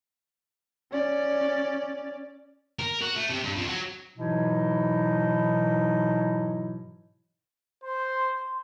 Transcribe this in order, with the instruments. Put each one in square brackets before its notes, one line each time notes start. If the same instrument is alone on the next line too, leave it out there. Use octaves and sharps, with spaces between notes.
[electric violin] C#4 D5
[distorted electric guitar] A#4
F#4
A3
C3
G2
F2
F#3
[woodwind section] G#2 B2 E3 F#3 D#4 E4
[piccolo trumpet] C5 [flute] C6